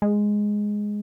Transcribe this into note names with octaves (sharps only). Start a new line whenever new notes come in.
G#3